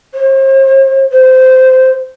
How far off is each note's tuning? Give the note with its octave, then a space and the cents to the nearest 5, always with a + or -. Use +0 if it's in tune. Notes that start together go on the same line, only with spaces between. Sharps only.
C5 +40
C5 -15